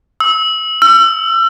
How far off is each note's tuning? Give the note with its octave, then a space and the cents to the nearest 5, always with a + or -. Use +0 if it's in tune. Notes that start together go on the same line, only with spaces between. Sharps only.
E6 -25
E6 +35